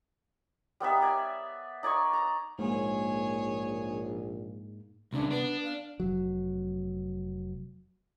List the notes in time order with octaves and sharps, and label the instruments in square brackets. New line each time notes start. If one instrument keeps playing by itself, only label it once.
[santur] G3 B3 D#4 E5
D5 G#5
D#4 D5 G#5 C#6
A#5
[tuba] A#1 [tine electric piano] G#2 [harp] A#3 [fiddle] G#4 C#5
[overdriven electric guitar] C2 C#3 [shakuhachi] D4
[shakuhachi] B3 [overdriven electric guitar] D4
[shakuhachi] F5
[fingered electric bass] F1 F#3